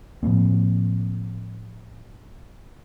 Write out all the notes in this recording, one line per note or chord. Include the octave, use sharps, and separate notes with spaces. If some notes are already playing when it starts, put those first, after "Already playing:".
A2 F3 A#3 C4